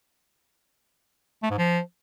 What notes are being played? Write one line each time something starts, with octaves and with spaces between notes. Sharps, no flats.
A3
G#2
F3